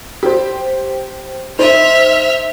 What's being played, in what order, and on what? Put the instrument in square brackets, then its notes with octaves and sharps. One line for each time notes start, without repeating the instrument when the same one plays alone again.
[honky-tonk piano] G4 C5
[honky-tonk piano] D#4 C5 [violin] E5 F6